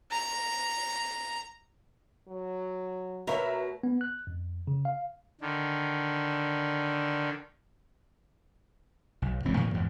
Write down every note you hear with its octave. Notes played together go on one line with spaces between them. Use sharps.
A#5
F#3
B2 A3 F#4 A#4 B4 C#5 E5 A#5
B3
F#6
F2
C#3
F5
D3 D#3
B1
E1 C#2 F3 C4
A2 D#3 F3 A#3
E2 G#2